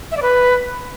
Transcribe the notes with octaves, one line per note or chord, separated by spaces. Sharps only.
E5
D5
B4